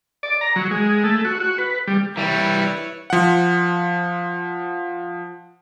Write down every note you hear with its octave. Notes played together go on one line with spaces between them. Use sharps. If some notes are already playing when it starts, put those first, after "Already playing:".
D5
A#5
F#3
G#3
A3
F#4
F#4
B4
G3
E3 G3 E4 B4 C#5
F3 F#5